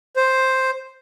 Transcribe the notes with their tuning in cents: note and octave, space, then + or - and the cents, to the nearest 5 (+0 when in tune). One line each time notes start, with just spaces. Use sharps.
C5 +5